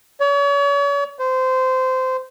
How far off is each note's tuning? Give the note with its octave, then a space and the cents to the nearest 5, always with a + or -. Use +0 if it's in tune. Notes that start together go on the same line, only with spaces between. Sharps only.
C#5 +40
C5 -20